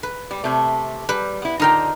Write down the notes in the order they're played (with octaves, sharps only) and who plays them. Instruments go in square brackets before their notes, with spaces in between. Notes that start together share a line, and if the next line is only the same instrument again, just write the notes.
[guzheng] B4
[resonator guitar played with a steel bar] G3
C3 A3
[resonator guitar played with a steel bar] G3 [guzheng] B4
[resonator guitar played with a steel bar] B3 E4
[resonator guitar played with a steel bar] D3 F4 A#5 [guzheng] D#4 A#4 G5